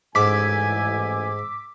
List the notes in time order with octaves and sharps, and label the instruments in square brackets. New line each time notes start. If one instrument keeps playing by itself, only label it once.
[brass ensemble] A1 G#5 [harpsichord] G#2 [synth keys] D6 E6 B6